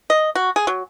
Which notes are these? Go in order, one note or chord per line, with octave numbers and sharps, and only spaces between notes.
D#5
F#4
G#4
F#3